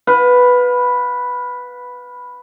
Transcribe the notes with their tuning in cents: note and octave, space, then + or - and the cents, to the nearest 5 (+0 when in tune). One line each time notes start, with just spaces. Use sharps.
B4 +0 F5 +35